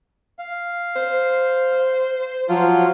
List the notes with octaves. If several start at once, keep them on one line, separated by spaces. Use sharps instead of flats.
F5
C5
F3 F#3 F4